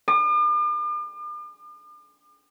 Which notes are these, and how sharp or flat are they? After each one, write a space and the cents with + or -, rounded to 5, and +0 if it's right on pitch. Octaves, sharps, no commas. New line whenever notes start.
D6 +45